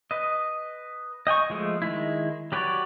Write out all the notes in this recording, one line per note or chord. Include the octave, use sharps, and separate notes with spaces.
B4 D#5
D#5 G5 G#5 C#6
F3 G#3 A3
D#3 G#3 E4
F#3 G4 B4 C#5 D5